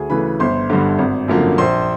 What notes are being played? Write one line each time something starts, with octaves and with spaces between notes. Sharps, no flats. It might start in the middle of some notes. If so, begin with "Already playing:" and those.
Already playing: D2 G#4 G#5
C#3 E3 A3 B4 B5
G1 C5 C6
G2 D3
G#1
F#2 D3 F3 A#3
A#1 C5 C6